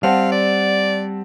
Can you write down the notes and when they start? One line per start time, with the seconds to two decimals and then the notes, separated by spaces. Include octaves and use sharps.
0.03 G3 C4 F5 F#5 A5
0.32 D5